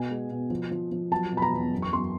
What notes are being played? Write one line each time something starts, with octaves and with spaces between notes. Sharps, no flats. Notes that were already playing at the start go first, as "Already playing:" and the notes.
Already playing: B2 G#5
G#3
B2
F3
F3
F3
F#3 A5
B2
B5
A#5
E2
F#2
C#6
F#2 C6